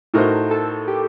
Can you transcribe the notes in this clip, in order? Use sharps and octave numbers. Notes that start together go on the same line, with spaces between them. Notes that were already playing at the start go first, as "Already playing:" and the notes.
A2 A3 D#4 F#4 A#4 C5
A4
G4